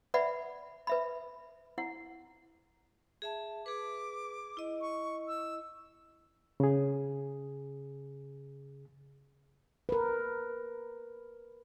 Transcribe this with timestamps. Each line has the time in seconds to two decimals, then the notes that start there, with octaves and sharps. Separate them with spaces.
0.14 B4 D5 E5 F#5 B5
0.87 B4 E5 B5
1.78 E4 F#5
3.22 G#4 E5 A5
3.66 G#4 B4 D6
4.57 E4 D#5
4.81 C#6
5.28 E6
6.60 C#3 G#4
9.89 A#4 B4